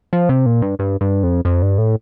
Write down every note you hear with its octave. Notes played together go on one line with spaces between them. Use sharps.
F3
C3
A#2
G2
G2
G2
F2
F2
G2
A2